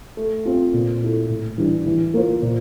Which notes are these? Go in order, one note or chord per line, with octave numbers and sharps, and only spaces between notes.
A3
C4 F4
A#2
A3 E4 A4
A2
E3 G3 D4 G4
E3
A#3 F4 C5
A#2